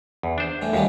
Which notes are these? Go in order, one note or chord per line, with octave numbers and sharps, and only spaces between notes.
E2
D4 C5
A2 E3
D#2 F3 G3 C#4